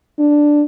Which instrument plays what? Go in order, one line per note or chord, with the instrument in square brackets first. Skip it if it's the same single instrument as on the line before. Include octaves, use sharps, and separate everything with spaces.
[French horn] D4